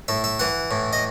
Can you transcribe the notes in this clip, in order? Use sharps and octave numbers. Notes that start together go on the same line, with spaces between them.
A2 E5
E5
E3 F#5
A2
D#5